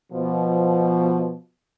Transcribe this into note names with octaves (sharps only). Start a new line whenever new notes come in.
B2 F3